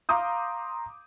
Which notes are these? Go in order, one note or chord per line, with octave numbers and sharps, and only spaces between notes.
F5 A#5 C6 D6 D#6 G6